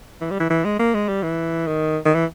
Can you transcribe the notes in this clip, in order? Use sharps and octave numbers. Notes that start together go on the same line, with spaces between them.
E3
G3
E3
E3
G#3
A#3
G#3
G3
E3
D#3
D#3
E3